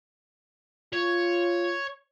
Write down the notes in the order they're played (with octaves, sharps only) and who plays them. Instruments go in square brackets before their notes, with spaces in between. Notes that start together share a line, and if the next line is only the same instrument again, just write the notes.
[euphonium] F4 [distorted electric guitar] C#5